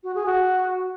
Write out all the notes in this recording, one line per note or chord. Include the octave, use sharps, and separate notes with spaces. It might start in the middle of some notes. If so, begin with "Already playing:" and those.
F#4
G#4
F#4